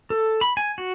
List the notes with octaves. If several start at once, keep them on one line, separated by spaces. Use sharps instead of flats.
A4
B5
G#5
F#4